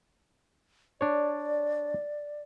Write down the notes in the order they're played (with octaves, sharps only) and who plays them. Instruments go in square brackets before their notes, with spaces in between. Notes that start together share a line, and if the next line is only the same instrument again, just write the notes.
[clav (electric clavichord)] D4 C#5 [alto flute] D5